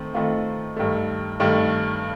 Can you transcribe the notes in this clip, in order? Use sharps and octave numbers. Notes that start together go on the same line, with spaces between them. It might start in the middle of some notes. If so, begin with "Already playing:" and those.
Already playing: D#3 A3 C4
D#3 A3 C4 F4
G2 D#3 A3
G2 D#3 A3